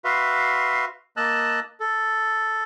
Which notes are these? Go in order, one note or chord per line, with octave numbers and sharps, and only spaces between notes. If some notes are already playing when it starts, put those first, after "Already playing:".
F#4 B4 E5 F5 C6
A#3 D#5 A5 E6 F#6
A4